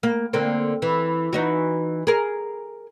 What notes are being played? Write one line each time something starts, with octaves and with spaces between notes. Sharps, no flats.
A#3
D3 A#3 C4
E3
E3 D#4 F#4
G#4 A#4